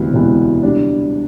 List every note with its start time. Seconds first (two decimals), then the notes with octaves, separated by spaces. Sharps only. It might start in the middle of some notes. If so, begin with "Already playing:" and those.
Already playing: E1 D2 C3 E3 B3
0.13 E1 D2 C3 E3 B3
0.63 C3 G3 D4